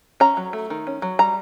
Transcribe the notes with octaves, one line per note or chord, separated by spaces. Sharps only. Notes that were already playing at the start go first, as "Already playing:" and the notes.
C#4 A#5
F#3
A3
D#3
C#4
F#3
G3 A#5